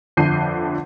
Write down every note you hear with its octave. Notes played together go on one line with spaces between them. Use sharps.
G1 F2 D3 G6 C7 D#7